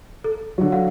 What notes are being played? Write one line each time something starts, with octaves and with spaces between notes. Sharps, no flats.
A4
D3 F#3
F5 F#5